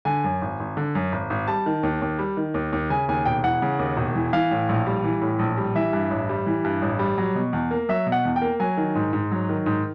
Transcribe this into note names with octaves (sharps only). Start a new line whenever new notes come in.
D3 G#5
F#2
G#1
G#1
D3
F#2
G#1
G#1
G3 A5
D#3
D#2
D#2
G3
D#3
D#2
D#2
C#3 G#5
D#2 G#5
E1 G5
E3 F#5
C#3
D#2
E1
E3
E3 F5
A2
A#1
G3
E3
A2
A#1
G3
E3 E5
G2
A1
G3
E3
G2
A1
G3
F#3
B2
E2
A#3
F#3 E5
B2
F#5
E2
G5
A#3
F#3 G#5
D#3
G#2
G#2
F#3
D#3
G#2